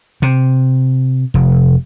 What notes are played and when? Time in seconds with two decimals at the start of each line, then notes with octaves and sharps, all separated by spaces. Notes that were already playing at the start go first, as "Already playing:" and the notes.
0.22 C3
1.34 F1